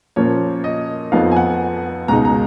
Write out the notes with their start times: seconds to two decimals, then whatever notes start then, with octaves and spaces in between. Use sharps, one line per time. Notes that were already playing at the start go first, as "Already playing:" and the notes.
0.16 A#2 F3 A#3 C#4 C#5
0.64 D#5
1.12 F2 F3 B3 D#4 F5
1.31 G#5
1.36 F#5
2.08 C#2 B2 G#3 D#4 A#5
2.25 A#5